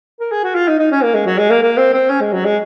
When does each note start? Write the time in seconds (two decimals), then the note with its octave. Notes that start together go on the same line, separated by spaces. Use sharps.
0.20 A#4
0.32 G#4
0.44 F#4
0.55 F4
0.68 D#4
0.79 D#4
0.92 C#4
1.03 A#3
1.15 G#3
1.26 F#3
1.38 G#3
1.50 A#3
1.62 A#3
1.77 C4
1.94 C4
2.09 C#4
2.21 G#3
2.33 F#3
2.45 G#3